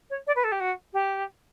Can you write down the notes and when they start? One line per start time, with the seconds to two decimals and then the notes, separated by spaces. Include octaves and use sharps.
0.10 C#5
0.27 D5
0.35 B4
0.44 A4
0.51 G4
0.60 F#4
0.93 G4